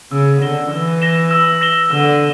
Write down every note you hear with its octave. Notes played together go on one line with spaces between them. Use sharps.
C#3 E6
D3 A#6 E7 G7
E3 E6
A#6 E7 G7
E6
A#6 E7 G7
D3 E6